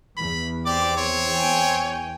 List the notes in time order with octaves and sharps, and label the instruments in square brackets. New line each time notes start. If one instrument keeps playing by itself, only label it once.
[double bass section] E2 [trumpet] B5
[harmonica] C4 G4 D6 [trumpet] D5
[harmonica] C4 [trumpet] C#5
[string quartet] G5 G#5